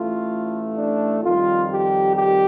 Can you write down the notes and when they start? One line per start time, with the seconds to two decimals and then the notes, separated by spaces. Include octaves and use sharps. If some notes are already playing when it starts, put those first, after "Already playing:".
Already playing: A1 A2 A3 F4
0.77 D4
1.24 F2 D#3 G3 F4
1.70 G4
2.16 G4